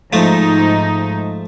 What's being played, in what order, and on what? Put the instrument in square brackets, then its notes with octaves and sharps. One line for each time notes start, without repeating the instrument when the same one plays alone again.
[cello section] G#2 D#4 [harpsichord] F3 A3